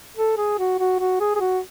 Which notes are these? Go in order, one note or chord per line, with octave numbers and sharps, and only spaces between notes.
A4
G#4
F#4
F#4
F#4
G#4
G#4
F#4